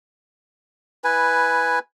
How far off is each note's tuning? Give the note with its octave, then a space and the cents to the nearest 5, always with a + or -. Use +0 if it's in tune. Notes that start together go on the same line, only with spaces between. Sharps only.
E4 -15 B4 +0 G#5 -5